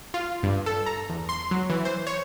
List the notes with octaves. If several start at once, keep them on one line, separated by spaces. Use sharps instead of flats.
F4
G2
A4
A#5
E2
C6
F#3
E3
C5
C#5